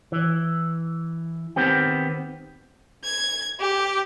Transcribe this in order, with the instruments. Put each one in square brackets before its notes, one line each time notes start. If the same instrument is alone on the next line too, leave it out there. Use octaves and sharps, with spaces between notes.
[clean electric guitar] E3
D#3 B3 C4 G4
[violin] G#6
G4